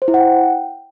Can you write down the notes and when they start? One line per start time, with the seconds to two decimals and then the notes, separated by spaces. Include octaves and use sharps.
0.02 C5
0.08 E4
0.14 F#5
0.20 G5